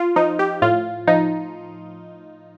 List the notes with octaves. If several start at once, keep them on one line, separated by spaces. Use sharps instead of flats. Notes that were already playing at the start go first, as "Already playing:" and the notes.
Already playing: F4
F3 D#4
G4
A2 F4
F3 D#4